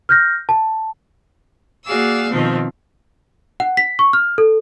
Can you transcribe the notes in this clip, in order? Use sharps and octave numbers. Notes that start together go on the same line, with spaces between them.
F6 G6 A#6
A5
A#3 F#4 G#4 D5 F5 E6
B2 D#3 F3 C4
F#5
B6
C#6
F6
A4